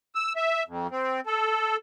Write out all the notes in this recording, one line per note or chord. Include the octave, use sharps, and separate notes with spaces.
E6
E5
F2
C4
A4